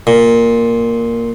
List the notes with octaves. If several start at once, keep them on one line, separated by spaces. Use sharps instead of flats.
A#2